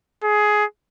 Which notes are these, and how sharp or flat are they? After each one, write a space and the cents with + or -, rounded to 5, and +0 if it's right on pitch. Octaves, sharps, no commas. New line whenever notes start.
G#4 +15